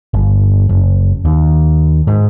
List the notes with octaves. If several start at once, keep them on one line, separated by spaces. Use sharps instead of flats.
G1
F#1
D#2
G#2